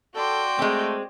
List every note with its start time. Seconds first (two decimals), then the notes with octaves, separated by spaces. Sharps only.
0.15 F#4 A4 D5 G5 C6
0.59 G#3 A3 C4